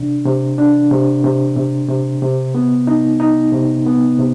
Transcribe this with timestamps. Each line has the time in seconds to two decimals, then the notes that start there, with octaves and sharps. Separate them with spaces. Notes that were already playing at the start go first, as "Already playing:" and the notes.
Already playing: C3 D4
0.26 C3
0.58 D4
0.91 C3
1.24 C3
1.56 C3
1.89 C3
2.22 C3
2.55 B3
2.87 D#4
3.20 D#4
3.53 C3
3.86 B3
4.19 C3